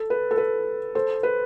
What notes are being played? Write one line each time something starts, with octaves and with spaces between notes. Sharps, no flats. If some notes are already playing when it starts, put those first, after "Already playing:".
Already playing: A4
B4
A4
B4
A4 C5
B4